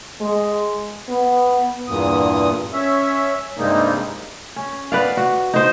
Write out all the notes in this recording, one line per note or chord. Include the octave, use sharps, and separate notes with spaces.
G#3
B3
E2 G2 A#2 D#6
C#4 E5
G2 C3 G3 G#3 A#3 D#4
C#4
B3 B4 D5 F5
F#4
D#4 C5